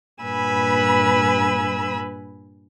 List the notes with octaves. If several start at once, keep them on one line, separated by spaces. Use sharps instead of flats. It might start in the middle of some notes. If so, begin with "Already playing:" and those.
G2 A#2 B4 G#5 B5 E6